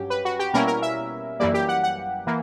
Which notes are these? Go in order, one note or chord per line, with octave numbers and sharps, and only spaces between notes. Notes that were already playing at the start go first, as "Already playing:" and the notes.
Already playing: G2 F#3 C#4 G4
B4
F#4
G4
B2 G3 A#3 C#4 E4 A#4
A#4
E5
F#2 E3 G3 A#3 D5
G4
F#5
F#5
E3 A#3